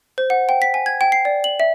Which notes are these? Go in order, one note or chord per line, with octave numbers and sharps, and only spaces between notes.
C5
F#5
G5
B6
G#5
G#6
G5
C7
D5
F#7
E5